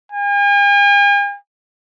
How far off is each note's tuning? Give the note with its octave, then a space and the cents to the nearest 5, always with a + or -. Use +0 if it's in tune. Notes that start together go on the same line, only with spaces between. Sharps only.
G#5 -45